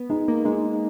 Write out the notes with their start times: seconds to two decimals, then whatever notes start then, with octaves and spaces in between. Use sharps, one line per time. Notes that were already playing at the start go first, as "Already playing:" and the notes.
Already playing: B3
0.10 G#3 D#4
0.28 A#3
0.45 G#3 D#4